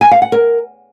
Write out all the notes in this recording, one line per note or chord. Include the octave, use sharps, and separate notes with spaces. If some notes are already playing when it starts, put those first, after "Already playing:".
G#5
F5
F#5
A#4